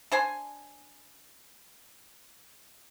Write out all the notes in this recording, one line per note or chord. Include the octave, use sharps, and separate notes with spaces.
D4 C5 G#5